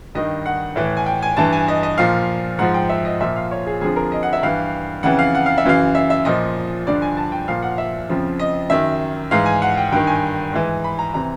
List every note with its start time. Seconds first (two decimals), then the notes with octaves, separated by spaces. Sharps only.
0.15 G2 D#3 D#5
0.46 F#5
0.76 A2 E3
0.97 G#5
1.06 G5
1.22 G#5
1.37 G2 E3 A5
1.53 G#5
1.68 D#5
1.83 D#5
1.98 A#2 F3 F5
2.59 G#2 F3 F#5
2.74 G5
2.89 E5
3.05 D#5
3.20 A#2 F3 E5
3.36 F5
3.51 C#5
3.67 G#4
3.81 F2 D3 F3 G#4
3.96 A#4
4.12 D#5
4.23 F#5
4.33 E5
4.43 G2 E3 F5
5.03 F2 C#3 E3 F#5
5.19 F5
5.35 F#5
5.46 F5
5.58 E5
5.65 F#2 C#3 E3 F5
5.95 E5
6.10 E5
6.25 A#2 F3 D#5
6.87 G2 D3 F3 D5
7.02 G#5
7.17 A5
7.32 G5
7.48 A#2 F3 F5
7.63 F#5
7.78 E5
8.09 F2 C#3 F3
8.39 D#5
8.70 F#2 D#3 E5
9.31 G#2 E3 F5
9.46 G#5
9.62 F#5
9.77 G5
9.92 G2 D#3 G5
10.07 G#5
10.53 G#2 E3
10.84 B5
10.99 A#5
11.14 C3 E3 A#5